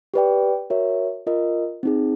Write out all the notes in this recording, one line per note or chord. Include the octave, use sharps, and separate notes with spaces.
G4 B4 D5 G5
F#4 A#4 C#5 E5
F4 A#4 D#5
C4 D#4 G#4